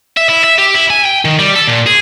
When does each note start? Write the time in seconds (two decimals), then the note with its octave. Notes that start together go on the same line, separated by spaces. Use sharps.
0.17 E5
0.29 E4
0.44 E5
0.58 G4
0.74 E4
0.90 G#5
1.05 G5
1.25 D#3
1.39 G3
1.56 A4
1.68 A#2
1.87 G#4